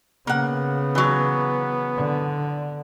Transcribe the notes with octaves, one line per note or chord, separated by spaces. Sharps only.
C#3 A#3 B3 F#5
E3 F#3
D3